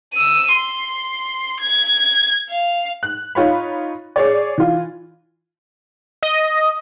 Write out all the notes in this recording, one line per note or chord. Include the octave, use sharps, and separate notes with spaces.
E6 D#7
C6
G#6
F5
F#6
D#4 F4 C#5 B5
G#4 C#5 D5
E3 F4
D#5